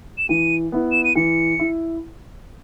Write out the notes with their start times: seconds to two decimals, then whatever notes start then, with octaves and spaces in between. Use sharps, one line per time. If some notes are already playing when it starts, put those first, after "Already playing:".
0.18 E7
0.29 E3 D#7
0.72 B3 E4
0.92 E7
1.04 D#7
1.15 E3 C#7
1.59 E4